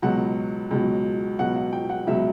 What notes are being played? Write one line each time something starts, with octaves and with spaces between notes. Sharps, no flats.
C#2 B2 F#3 F#5
C#2 B2 F#3
C#2 B2 F#3 F#5
F#5
G5
F#5
C#2 B2 F#3 E5